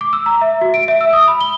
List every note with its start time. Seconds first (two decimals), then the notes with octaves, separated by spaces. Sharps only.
0.01 D6
0.13 E6
0.26 A#5
0.41 E5
0.61 F#4
0.74 D7
0.88 E5
1.01 E6
1.13 D#6
1.28 B5
1.41 G7